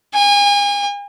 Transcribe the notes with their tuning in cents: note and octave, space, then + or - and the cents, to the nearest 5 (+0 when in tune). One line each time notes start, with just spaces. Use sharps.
G#5 -35